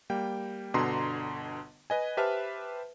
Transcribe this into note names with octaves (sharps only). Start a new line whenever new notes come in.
G3 A#3 G5
G1 B2 D3 A#5 C6
B4 D#5 G#5
G4 B4 C5 E5 A5 F6